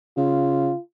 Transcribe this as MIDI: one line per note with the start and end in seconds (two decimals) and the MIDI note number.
0.17 0.72 49
0.17 0.79 65